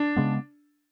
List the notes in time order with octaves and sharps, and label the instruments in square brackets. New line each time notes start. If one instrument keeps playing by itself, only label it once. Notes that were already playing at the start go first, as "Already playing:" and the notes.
Already playing: [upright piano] D4
[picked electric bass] C#3 G#3 B3